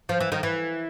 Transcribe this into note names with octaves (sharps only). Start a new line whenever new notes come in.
F3
E3
D#3
E3